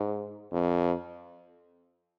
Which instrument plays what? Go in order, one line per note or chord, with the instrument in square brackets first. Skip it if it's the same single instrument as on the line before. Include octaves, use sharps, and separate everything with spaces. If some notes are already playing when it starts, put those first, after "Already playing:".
Already playing: [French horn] G#2
F2